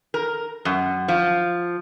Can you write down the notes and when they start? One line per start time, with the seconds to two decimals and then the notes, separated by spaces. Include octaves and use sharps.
0.14 A#4
0.65 F#2
1.08 F3